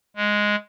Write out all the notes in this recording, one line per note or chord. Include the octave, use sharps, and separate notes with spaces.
G#3